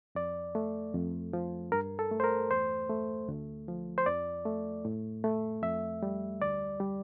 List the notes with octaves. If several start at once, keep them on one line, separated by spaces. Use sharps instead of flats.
F2 D5
A3
F2
F3
G2 A#4
A4
A3
C5
A#4
E2 C5
A3
D2
F3
C5
F2 D5
A3
A2
A3
F2 E5
G3
D2 D5
G3